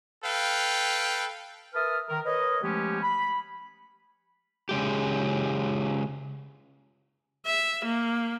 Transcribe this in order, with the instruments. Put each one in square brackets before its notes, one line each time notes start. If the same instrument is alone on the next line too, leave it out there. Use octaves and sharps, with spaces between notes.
[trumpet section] A4 B4 F5 G5
[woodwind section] A#4 B4 E5 A5 D#6 F6
D#3 A#4
A#4 B4 C#5 D#5
F3 G#3 A3 B3 C#4 G4
B5
[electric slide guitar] C#3 G#3 G4
[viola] E5
A#3